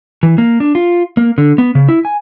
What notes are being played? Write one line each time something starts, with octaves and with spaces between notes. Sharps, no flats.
E3
A#3
D4
F4
A#3
D3
B3
C#3
E4
G#5